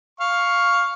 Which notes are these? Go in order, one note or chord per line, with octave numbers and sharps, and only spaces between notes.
F5 C#6